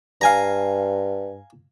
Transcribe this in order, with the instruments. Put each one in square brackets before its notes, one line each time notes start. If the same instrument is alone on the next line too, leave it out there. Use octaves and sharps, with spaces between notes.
[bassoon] G2 [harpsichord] F5 G#5 A#5